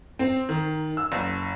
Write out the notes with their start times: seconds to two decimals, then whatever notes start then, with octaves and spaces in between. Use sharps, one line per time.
0.19 C4
0.49 D#3
0.97 E6
1.12 F#1